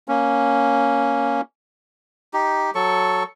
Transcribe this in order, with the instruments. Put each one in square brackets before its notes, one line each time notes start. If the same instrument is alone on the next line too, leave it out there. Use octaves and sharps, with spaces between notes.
[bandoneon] A#3 C#4
[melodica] D#4 G4
F#3 A4 C#6